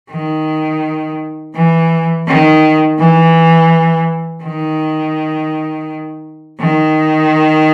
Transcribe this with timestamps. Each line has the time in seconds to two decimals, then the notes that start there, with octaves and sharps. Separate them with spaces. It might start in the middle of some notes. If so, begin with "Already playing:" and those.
0.11 D#3
1.55 E3
2.27 D#3
2.99 E3
4.43 D#3
6.60 D#3